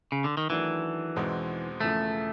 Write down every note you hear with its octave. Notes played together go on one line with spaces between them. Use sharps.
C#3
D3
D#3
D#3 E3 F#3 A3 D4
E2 B2 G#3 C4 D#4
E1 E2 C#3 F3 A3